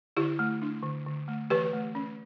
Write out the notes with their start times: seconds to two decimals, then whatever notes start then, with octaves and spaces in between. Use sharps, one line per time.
0.17 D3 E4 G4
0.39 A3
0.62 D4
0.83 D3
1.06 D3
1.28 A3
1.50 E3 G4 B4
1.73 A3
1.95 C#4